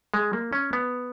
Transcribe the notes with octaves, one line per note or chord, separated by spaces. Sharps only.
G#3
A#3
C#4
B3